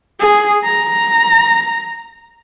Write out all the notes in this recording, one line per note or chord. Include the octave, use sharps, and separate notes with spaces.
G#4
A#5